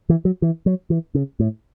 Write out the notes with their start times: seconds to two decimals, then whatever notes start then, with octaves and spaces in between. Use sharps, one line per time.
0.09 E3
0.25 F#3
0.42 E3
0.66 F#3
0.90 E3
1.15 C#3
1.40 A2